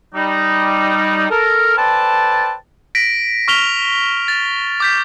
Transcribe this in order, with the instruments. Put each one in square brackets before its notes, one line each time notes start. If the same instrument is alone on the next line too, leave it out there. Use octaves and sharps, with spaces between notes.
[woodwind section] G3 D#4
A4 A#4
A4 B4 C5 D5 G5 A5
[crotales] A#6 B6 D7
C#6 F6 B6 F7 G7
A6
D6 G6 B6